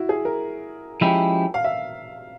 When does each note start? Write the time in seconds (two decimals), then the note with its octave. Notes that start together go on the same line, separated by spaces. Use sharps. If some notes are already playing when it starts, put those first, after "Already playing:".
Already playing: E4 F#4
0.09 G#4
0.25 A#4
1.01 F3 G#3 C#4 E4 G4
1.54 F5
1.64 E5